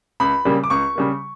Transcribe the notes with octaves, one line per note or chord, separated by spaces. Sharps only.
C#2 B5
C#3 G3 A#3
D6
C#2 C#6
C#3 G3 A#3